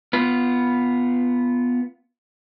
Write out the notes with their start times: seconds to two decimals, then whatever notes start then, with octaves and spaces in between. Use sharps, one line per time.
0.13 B3 F4